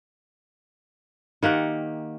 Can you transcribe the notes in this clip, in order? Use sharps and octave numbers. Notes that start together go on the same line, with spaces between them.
D#3 A#3 G4 F#5